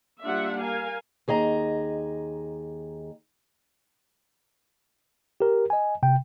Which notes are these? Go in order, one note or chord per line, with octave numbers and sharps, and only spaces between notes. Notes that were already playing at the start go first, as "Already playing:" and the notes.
G3 A#3 D4 F4 E5 F#5
A#4 F5 G#5
D#2 G#4 D#5 A#5
G4 A#4
D#5 G#5
C3 G5